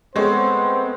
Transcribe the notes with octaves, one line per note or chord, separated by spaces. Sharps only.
G#3 A3 B3 C4 C5 C#5